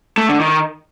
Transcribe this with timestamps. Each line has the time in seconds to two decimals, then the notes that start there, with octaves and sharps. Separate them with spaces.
0.18 A3
0.29 D3
0.40 D#3